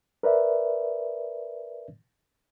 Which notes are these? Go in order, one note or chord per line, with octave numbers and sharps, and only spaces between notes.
A#4 B4 D5 E5